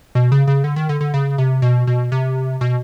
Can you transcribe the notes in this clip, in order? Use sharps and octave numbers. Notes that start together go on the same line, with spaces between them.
B2
C#3
C#3
D3
D#3
D3
D3
C#3
C3
B2
B2
C3
B2